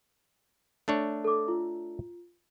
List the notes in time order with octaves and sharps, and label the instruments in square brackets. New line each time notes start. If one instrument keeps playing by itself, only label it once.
[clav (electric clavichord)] A3 D4 C#5
[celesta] A4 D6
F4